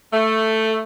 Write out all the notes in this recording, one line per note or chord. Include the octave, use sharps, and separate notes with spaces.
A3